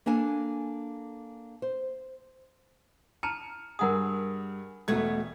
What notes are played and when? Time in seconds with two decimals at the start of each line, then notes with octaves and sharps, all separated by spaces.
0.06 A#3 D4 A4 G#5 A5
1.62 C5
3.23 A5 A#5 F6 C#7
3.79 G2 G#4 A#4 F#5 D#6
4.88 E1 B2 A3 B3 G#6